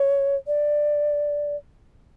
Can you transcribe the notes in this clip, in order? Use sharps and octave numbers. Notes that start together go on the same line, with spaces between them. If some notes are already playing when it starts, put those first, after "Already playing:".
Already playing: C#5
D5